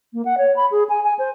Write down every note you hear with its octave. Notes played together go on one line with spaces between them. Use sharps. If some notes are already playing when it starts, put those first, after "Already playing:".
A#3
F#5
C#5
B5
G#4
G#5
G#5
C5